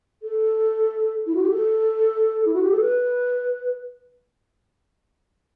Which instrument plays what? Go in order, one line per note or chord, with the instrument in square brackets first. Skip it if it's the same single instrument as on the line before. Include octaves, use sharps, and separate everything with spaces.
[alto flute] A4
E4
F#4
G4
A4
E4
F#4
G4
A4
B4